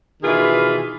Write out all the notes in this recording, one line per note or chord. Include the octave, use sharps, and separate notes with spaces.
B2 D#3 E3 F4 G#4 B4